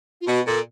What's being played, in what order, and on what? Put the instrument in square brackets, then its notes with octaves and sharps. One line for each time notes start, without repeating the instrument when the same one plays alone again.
[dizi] F4
[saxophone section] B2 [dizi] F#4
[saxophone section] A#2 [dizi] A4